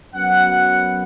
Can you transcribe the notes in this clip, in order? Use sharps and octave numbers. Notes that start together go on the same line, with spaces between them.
F#2 F#3 B3 F#5
F#5